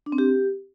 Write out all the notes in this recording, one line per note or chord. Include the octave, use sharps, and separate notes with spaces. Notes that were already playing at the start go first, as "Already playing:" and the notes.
D4
C4
G4